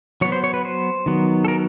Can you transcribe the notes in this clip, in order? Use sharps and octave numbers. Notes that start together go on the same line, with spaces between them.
F#3 B3 C#5
C5
C#5
B4
C5
D#3 F#3 B3
A4
A#4